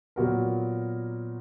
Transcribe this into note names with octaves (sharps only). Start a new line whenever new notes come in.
A#2 F#3 B3 F#4 A#4